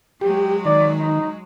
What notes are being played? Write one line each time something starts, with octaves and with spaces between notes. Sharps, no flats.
F#3 G#3 G4
D#3 D5
D#4